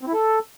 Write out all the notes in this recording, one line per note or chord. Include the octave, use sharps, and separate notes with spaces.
C4
E4
A4